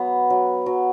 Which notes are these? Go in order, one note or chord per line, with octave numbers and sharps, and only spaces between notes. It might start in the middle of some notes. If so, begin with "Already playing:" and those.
Already playing: F#3 B3
F#3
F#3